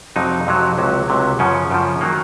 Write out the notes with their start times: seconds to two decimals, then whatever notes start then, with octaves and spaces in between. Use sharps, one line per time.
0.16 F2 C3 F#3 D#4
0.47 F2 C3 F#3
0.78 C#2 C3 F#3
1.08 C#2 C3 F#3
1.39 F#2 C#3 F3 C#4
1.70 F#2 C#3 F3
2.01 D#3 F#3 A#3